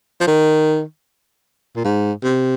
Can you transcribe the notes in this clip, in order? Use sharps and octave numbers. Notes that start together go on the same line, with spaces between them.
F3
D#3
A#2
G#2
C3